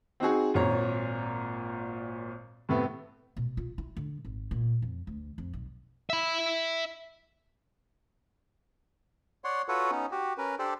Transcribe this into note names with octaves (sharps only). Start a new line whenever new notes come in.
C4 D#4 F#4 G#4
G#1 A#2 C#5 A#5
A2 C3 A3 B3
B2
F4
E4
D3
G#1
A#2
F2
D2
F2
B1
E5 B5
C#5 D5 F#5 C6
F4 F#4 A4 B4 C#5 F#5
B3 C#4 D#4
F#4 G4
C#4 A#4 B4
D4 G4 A4 C5 D5